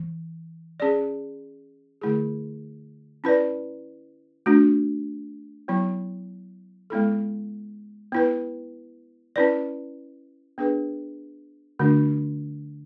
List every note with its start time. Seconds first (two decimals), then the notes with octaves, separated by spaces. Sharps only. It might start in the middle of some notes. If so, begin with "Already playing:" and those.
Already playing: E3
0.80 C#4 G#4 D5
2.01 D3 A3 E4 G#4
3.24 C#4 E4 B4 D5
4.46 A3 D4 F#4
5.68 F#3 B3 E4
6.90 G#3 B3 E4 A4
8.12 B3 E4 B4
9.36 C#4 E4 B4 D5
10.58 B3 D4 G#4 B4
11.79 D3 A3 D4 F#4